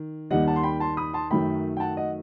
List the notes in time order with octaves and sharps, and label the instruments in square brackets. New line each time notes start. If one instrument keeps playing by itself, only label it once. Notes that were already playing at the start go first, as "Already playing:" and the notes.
Already playing: [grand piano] D#3
D#2 D#3 G3 D#5 F#5
F#5 A5
C6
G5 B5
A5 C6
B5 D#6
A5 C6
F#2 D#3 F#3 A3 G5 B5
G5
F#5 A5
D#5 F#5